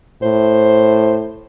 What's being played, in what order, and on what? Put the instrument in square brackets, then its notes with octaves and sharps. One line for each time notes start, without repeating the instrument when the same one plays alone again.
[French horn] A2 [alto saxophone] C5